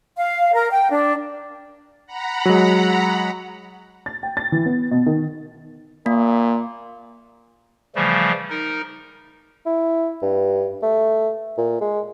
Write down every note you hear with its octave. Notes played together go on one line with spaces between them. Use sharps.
F5
A#4
G5
D4
F#5 A#5 B5
F#3 G#3
A6
G5
A6
E3
B3
B2
D#3
A#2 A#3
C#3 E3 F3 G3 A3
D#4 A#4
E4
G2
A3
A#2
G#3